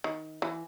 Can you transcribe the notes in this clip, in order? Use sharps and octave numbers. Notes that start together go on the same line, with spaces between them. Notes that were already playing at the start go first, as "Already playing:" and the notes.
D#3
E3